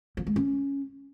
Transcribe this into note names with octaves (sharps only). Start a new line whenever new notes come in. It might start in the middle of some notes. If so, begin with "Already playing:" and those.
F3
G#3
C#4